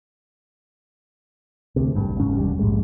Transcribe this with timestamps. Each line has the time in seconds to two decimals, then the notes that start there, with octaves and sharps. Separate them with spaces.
1.76 D2 C3
1.95 G#1 G2
2.17 F#1 G#2 C#4
2.37 F1 D#2 G3
2.59 A#1 G#2 G#3